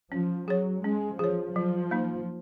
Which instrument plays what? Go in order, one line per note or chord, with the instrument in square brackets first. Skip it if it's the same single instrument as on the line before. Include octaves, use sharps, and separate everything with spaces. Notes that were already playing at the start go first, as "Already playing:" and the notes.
[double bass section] F3 [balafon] C#4
[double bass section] F#3 [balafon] G#4 C#5
[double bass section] G#3 [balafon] C#4
[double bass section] F3 [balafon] G#4 C#5
[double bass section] F3 [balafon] F#3
[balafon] A#3 D#4